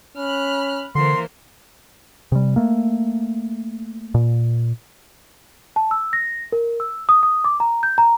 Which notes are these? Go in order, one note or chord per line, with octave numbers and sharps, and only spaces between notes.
C#4 B5 F6 F#6
D3 E3 A#3 C5 C6
C3 G3
A3 A#3
A#2
A5
E6
A#6
A#4
E6
D#6
D#6
D6
A#5
G6
A#5